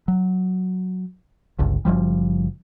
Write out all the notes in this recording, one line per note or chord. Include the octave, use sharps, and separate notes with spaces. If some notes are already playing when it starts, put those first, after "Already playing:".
F#3
G1 C#2
F#1 E2 F3 G3